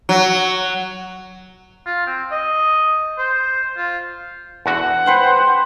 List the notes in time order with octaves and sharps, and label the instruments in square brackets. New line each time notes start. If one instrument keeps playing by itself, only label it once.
[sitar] F#3
[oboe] F4
C4
D#5
C5
F4
[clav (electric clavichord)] E2 D3 F#4 [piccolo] F#5
[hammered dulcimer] B4 C5 G5